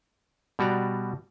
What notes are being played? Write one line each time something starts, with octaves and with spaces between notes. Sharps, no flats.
B2 G3 F#4 D5 A#5